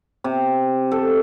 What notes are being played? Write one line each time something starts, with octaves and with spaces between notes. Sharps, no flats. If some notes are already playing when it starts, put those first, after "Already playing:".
C3
A4